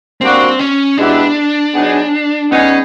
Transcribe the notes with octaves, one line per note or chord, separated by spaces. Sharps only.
G3 A#3 C4 D4 F#4
C#4
B2 G#3 B3 D4 E4 G4
F#3 B3 D#4 G#4
G3 B3 C#4 D#4 G#4